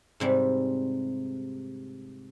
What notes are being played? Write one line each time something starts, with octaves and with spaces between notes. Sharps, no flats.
G#2 C3 G3